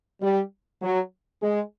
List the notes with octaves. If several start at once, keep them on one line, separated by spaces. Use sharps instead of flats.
G3
F#3
G#3